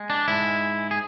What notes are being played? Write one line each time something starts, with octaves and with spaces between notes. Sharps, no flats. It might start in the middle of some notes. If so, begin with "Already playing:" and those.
Already playing: G#3
D4
G#2 G#3 E4
G#4